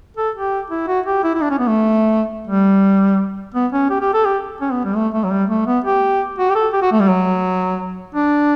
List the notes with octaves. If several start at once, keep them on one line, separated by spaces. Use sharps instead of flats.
A4
G4
E4
F#4
G4
E4
E4
D4
C#4
B3
A3
G3
B3
C#4
G4
G4
A4
G4
C#4
B3
G3
A3
A3
F#3
G3
A3
B3
G4
F#4
G4
A4
G4
F#4
A3
G3
F#3
D4